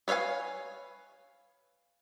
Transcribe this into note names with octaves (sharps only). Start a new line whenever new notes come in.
B4 C#5 E5 F5 G#5